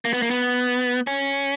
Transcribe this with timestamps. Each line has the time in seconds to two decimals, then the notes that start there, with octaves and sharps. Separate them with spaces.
0.05 A#3
0.13 B3
0.22 A#3
0.30 B3
1.07 C#4